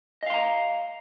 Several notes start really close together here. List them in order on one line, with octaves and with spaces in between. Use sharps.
D#5 F5 C6 A#5